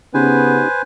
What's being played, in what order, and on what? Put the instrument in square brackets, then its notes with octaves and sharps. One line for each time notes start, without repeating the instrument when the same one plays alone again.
[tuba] C#3 [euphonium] B3 [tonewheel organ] C#4 D#4 G4 [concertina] B4 C5 G#5